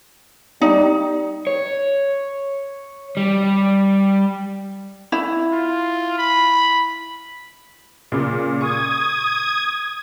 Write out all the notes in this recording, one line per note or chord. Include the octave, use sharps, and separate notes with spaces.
G3 D#4
C#5
G3
E4
F4
B5
A#2 C#3
C#6 D#6 G#6